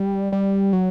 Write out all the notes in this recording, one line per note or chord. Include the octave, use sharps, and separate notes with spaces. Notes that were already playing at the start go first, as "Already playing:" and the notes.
Already playing: G3
G3
F#3